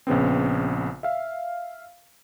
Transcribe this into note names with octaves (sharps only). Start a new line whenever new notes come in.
A#1 C#3 B3 C4
E5 F5